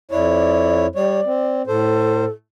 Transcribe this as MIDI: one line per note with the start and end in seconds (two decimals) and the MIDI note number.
0.11 0.86 41
0.11 0.86 64
0.11 0.86 73
0.11 0.87 74
0.95 1.20 55
0.95 1.20 73
0.95 1.66 74
1.26 1.62 60
1.67 2.25 45
1.67 2.28 69
1.67 2.25 72